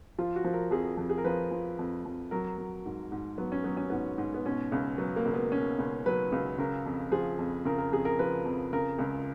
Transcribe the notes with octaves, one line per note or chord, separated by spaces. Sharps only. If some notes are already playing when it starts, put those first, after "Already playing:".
F3 F4
F#4
F3
A#4
F2 G#4
F2
G#4
A#4
F3 B4
F3
F2
F2
F#3 A#4
F#3
G#2
G#2
F#3 B3
C#4
F#3 B3
C#4
G#2 B3
G#2
B3
B2 C#4
C#2
F#3 B3
A#3
C#2
B3
B2 C#4
C#2
F#3 B4
C#2
C#3 A#4
F2
F3 G#4
F2
C#3 A#4
A#4
F2 G#4
A#4
F3 B4
F2
C#3 A#4
C#2